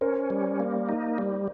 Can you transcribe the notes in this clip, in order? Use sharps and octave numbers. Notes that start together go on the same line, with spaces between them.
C#4 A#4 C5
G3
A#3
D#4
G3